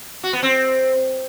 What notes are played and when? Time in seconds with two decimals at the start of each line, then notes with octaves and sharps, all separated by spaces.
0.23 F#4
0.33 B3
0.43 C4